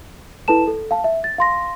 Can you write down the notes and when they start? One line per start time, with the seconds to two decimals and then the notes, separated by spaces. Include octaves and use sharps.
0.48 E4 A4 B4 A5 E7
0.67 A4
0.91 F5 A5
1.04 E5
1.24 A6
1.38 F5 C6 A#6